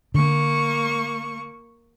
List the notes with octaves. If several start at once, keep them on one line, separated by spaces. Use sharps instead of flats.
D3 A#3 C#6